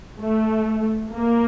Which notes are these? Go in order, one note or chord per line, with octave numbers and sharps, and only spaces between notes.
A3
A#3